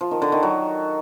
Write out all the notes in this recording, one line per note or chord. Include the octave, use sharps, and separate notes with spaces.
F3
D#3
D3
D#3
F#3